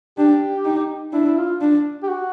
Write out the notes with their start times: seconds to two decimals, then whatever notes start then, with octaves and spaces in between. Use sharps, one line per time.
0.18 D4 G4
0.65 D#4
1.13 D4 E4
1.26 E4
1.37 F4
1.61 D4
2.03 G4
2.09 F#4